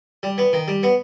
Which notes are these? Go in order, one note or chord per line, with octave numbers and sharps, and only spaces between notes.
G3
B3
D#3
G3
B3